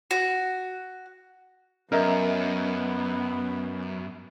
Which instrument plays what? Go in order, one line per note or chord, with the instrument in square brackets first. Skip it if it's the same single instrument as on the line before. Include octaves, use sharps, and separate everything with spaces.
[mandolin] F#4
[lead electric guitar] F#2 [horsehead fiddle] B3 [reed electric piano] C#4 D#5 E5 [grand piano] A#4